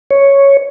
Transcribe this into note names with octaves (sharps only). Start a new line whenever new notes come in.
C#5